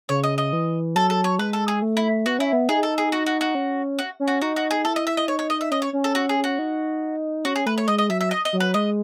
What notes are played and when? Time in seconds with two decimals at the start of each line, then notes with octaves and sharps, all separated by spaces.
0.09 C#3 C#5
0.24 D#5
0.38 D#5
0.53 E3
0.95 F#3 A4
1.10 A4
1.24 C#5
1.39 G#3 B4
1.53 A4
1.68 G#4
1.82 A3
1.97 E4
2.26 B3 F#4
2.39 C#4 E4
2.53 B3
2.69 D#4 G#4
2.83 A4
2.98 G#4
3.12 F#4
3.26 F#4
3.41 F#4
3.55 C#4
3.99 F#4
4.20 C#4
4.28 F#4
4.42 D#4 F#4
4.56 F#4
4.71 G#4
4.85 E4 A4
4.96 D#5
5.07 E5
5.17 D#5
5.28 D#4 C#5
5.39 C#5
5.50 D#5
5.61 E5
5.71 C#4 D#5
5.82 C#5
5.93 C#4
6.04 A4
6.15 F#4
6.29 G#4
6.44 F#4
6.59 D#4
7.45 C#4 F#4
7.56 G#4
7.66 A3 B4
7.78 C#5
7.88 G#3 D#5
7.98 D#5
8.10 F#3 E5
8.21 E5
8.31 D#5
8.45 D#5
8.53 F#3
8.60 B4
8.74 G#3 D#5